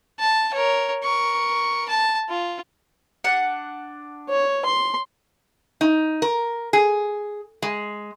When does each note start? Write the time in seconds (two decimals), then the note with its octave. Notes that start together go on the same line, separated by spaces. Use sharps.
0.19 A5
0.54 A#4 C#5
1.03 A#4 C#6
1.89 A5
2.29 F4
3.24 D4 F#5
4.29 C#5
4.65 C6
5.81 D#4
6.22 A#4
6.73 G#4
7.62 G#3